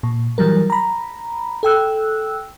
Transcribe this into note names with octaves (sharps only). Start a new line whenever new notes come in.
A#2
E3 F#3 G3 A#4
A#5 B5
A4 G5 E6 F#6